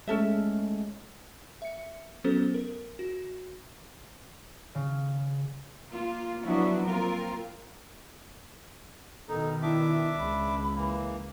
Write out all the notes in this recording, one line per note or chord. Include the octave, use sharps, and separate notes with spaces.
G#3 A3 C#4 A4 E5
E5 C#7
F#3 B3 C#4 F#4 A4 C5
A#4
F#4
C#3
A#3 F4
F3 F#3 B3 D4 E4 F#4
A#3 C4 F4 A#4
B2 D#3 D#4 A4
D4 E4 E5 D6
C#2 B5
E3 A#3